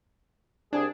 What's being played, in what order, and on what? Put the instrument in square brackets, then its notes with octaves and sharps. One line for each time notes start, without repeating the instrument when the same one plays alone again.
[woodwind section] C2 G#4 [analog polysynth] D4